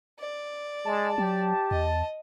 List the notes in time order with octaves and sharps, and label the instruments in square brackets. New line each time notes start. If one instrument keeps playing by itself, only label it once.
[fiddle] D5
[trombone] G#3 [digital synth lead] A5
[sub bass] F#3 [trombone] G4
[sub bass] E2 [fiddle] D#5